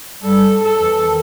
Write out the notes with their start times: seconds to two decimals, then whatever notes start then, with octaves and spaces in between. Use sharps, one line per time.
0.23 G2 G3 A4
0.63 A4
0.77 E2 E3
1.04 D#3